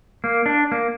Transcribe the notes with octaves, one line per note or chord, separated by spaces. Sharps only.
A#3
D4
A#3